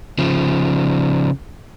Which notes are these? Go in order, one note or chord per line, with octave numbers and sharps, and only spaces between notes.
C#3 F3